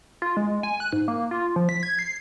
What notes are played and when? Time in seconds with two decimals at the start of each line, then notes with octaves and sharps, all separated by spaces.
0.22 F4
0.37 G#3
0.63 G#5
0.80 F#6
0.92 G#2
1.08 A#3
1.31 F4
1.56 F3
1.69 B6
1.83 G#6
1.99 C7